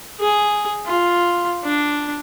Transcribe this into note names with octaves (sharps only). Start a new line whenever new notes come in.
G#4
F4
D4